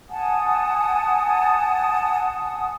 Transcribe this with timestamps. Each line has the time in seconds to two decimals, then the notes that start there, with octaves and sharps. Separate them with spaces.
0.09 F#5 G#5 A5 D#6